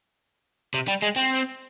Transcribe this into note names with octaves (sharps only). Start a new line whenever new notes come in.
C3
G3
G#3
C4